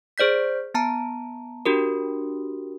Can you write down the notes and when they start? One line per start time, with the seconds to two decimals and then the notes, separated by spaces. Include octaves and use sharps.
0.18 G#4 C5 D5 G6 B6
0.74 B3 A5 A#5
1.66 D4 F#4 G4 A#4